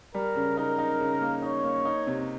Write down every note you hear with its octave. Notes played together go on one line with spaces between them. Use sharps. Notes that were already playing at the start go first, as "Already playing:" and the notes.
G3 A#4
C#3
D#4 A#4
D#4
C#3
A#3
D#4 C#5
A#3
D#4
C3